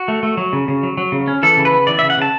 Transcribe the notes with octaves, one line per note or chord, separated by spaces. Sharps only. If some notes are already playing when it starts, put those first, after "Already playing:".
Already playing: F#4
A3
A3
F#3
C#3
C#3
F#3
F#3
C#3
C#4
E3 A4
C#3
B4
B3
E3 D5
C#3 E5
F#5
C#3 A5